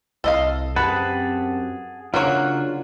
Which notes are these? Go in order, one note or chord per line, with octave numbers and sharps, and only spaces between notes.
C2 A4 D#5 F5
F#2 C4 G4 G#4 B4 F#5 A5
C#3 F#3 A#3 D4 F4 C#5 F#5